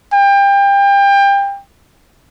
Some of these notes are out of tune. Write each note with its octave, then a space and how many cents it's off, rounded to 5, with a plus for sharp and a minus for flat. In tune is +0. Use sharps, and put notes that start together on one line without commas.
G5 +30